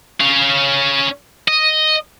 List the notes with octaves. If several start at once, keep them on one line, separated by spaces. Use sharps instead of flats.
C#4 F5
D#5